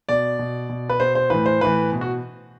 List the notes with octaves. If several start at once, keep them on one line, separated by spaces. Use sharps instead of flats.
B2 D5
B2
B2
B4
B2 C5
C5
A2 E3 B4
C5
A2 E3 B4
B2
F#4